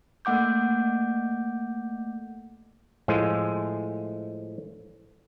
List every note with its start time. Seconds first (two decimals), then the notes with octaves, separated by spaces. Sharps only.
0.25 A3 A#3 F#5 D6 G6
3.08 A2 F3 G#3